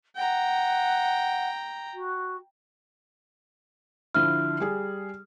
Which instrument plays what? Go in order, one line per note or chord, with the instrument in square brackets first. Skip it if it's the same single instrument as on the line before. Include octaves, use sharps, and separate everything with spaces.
[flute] F#5 [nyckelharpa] G5 A#5
[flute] F#4
[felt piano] D3 F3 E4 [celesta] F6
[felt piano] G3 G#4